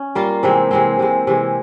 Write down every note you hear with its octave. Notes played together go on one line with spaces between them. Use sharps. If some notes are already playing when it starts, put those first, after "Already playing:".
Already playing: C#4
G3 A#3 F4
C3 E3 G#3 C4
C3 E3 G#3 C4
C3 E3 G#3
C3 E3 G#3